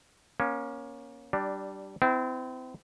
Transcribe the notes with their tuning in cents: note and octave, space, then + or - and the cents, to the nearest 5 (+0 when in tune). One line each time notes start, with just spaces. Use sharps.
A#3 +30 C#4 +0
G3 -15 D4 +5
C4 -30 E4 +0